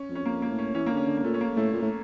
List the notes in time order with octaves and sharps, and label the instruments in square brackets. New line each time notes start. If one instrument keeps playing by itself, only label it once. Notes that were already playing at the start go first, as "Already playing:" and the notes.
Already playing: [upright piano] C#4
[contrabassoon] F2
[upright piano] C#4
[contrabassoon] F2 [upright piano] A#3
[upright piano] A#3
[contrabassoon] A2
[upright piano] C#4
[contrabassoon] E3 [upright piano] C#4
[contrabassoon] D3 [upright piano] A#3
[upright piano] C#4
[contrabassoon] D3
[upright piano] A#3
[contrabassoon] A#2 [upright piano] A3
[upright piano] C#4
A#3
[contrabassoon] A2 [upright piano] A3
[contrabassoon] A#2
A2